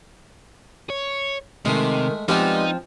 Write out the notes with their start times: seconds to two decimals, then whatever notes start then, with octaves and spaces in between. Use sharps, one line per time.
0.90 C#5
1.65 C3 D#3 G#3 A3
2.28 F3 G3 G#3 B3 C4 D#4